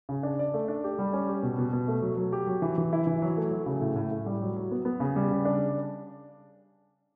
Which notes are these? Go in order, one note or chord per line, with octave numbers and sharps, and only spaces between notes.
C#3
D4
D5
A3
D4
G4
G3
C#4
G4
B2
B2
B2
A3
F#3
F#3
G4
F#3
E3
E3
E4
E3
F#3
A3
F#3
C#3
A2
A2
A2
G3
F#3
F#3
B3
B3
C#3
G3
C#3
D4